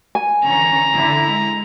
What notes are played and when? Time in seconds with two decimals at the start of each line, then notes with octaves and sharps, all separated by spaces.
0.15 G#5
0.44 D3 E3 C#4 A#5
0.93 D3 E4
1.27 G#3